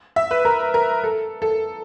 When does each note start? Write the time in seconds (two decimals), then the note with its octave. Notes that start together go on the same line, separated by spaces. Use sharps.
0.16 E5
0.31 B4
0.45 A#4
0.74 A#4
1.04 A4
1.42 A4